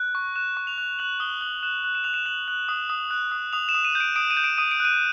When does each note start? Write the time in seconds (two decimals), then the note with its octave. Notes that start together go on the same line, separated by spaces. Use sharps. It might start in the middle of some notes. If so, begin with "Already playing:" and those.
Already playing: F#6
0.15 C#6
0.36 F#6 E7
0.57 C#6
0.67 F7
0.78 F#6
0.99 F#6 F#7
1.20 D#6 G7
1.41 F#6 F#7
1.63 F#6 E7
1.84 F#6
1.95 E7
2.04 F#6 F7
2.14 E7
2.26 F#6 F#7
2.48 F#6
2.69 D#6
2.90 D#6
3.11 F#6
3.31 D#6
3.53 D#6 F7
3.69 E7
3.74 D#6
3.85 D#7
3.95 G6
4.00 D7
4.16 D#6 D7
4.31 D#7
4.37 G6
4.44 D7
4.58 D#6 D#7
4.71 D7
4.80 F#6 D#7